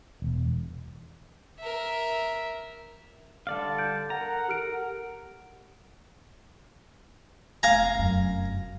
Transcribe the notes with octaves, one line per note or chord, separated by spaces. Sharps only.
E1
A#4 E5
D3 G3 A4 D5 F5
G6 D7
A4 A#4 F#5 A#5
G4 F6 D7
F1 F2 F5 G#5 A#5
F1 F#2